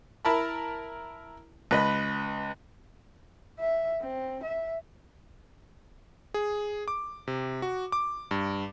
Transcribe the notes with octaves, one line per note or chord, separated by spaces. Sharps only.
E4 A#4 A5 B5
C#2 B4 D#5 B5
E5
C4
E5
G#4
D6
C3
F#4
D6
G2